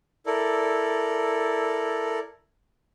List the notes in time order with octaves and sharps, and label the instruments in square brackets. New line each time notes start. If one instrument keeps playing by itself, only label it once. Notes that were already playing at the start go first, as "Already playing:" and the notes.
[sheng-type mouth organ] E4 A4 A#4 D5